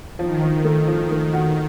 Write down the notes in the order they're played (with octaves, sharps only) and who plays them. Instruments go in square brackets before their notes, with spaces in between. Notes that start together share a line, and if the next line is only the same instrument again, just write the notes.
[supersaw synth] D#3 [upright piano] F3
[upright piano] F3
A3
F3
A3
F#4